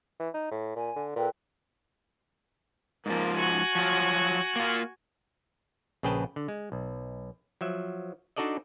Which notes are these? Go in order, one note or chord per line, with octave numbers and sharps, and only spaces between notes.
E3
D#4
A2
A#2 G#5
D3
A#2 A4 B4 G5
G#2 F3 A#3
F#4 G#5
F3 F#3
A#3 F4
A#1 C#3 G#4 B4 G5 A5
D3
G#3
B1
F3 F#3 E5
D4 D#4 F#4 A4 D5 D#5